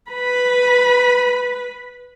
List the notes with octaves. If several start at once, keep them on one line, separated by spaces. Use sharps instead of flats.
B4 B5